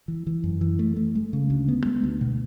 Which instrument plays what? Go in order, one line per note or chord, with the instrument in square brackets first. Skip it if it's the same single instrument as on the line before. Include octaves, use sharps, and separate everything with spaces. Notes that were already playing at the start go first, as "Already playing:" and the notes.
[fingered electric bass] E3
E3
F#2
E3
A3
A3
G#3
C#3
D2
B3
G#3
D2
B2